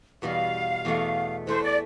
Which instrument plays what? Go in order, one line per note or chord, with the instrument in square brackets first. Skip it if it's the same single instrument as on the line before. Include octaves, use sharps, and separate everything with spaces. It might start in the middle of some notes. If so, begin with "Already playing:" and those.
[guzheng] E2 B2 G3 [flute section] F5
[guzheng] E2 B2 A3
[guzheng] E3 A3 E4 [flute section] C5
[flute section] D5